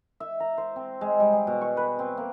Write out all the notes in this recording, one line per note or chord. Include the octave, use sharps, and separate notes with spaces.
E5
A#5
C5
C4
G#3
G3
G#4
B2
C#6
B4
C4
A#3